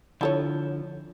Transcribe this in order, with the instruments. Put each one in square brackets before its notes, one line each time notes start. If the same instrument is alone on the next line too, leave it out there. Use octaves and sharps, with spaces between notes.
[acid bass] D3 [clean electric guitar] F3 [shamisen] E4 A4 C#5